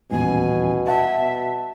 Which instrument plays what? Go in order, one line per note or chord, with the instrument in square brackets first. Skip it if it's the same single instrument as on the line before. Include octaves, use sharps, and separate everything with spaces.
[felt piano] D#1 A1 E2 [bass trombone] B2 [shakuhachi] G#5
[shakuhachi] E5 [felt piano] F#5 A5
[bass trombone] B2